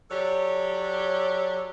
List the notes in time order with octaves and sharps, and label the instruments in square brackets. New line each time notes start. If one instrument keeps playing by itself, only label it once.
[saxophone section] F#3 G4 A4 C#5 D5